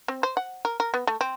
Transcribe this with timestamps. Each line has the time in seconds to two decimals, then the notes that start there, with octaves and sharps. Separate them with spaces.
0.08 C4
0.23 C5
0.37 F#5
0.65 A#4
0.80 A#4
0.94 B3
1.07 A3
1.21 C4